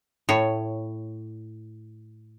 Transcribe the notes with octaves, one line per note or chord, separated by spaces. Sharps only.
A2 C#5